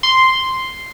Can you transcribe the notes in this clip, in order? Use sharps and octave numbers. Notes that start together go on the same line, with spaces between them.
C6